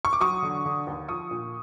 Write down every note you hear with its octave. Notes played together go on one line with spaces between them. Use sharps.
C#6
D6
F#3 C#6 D#6
D3
D3
D#2
F3 C#6 D#6
A#2